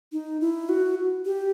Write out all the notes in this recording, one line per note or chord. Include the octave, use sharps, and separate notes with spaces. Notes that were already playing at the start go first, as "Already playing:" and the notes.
D#4
E4
F#4
G4